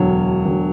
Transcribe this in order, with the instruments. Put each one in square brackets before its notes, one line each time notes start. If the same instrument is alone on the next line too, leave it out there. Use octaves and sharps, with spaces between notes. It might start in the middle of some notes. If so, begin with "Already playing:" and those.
Already playing: [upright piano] E1 D2 D3 [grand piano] F#3
[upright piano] E1 D3